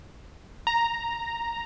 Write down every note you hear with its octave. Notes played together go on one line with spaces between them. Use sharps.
A#5